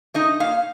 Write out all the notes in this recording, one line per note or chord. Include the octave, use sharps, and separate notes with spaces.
A3 D#4 D#5
A#2 F5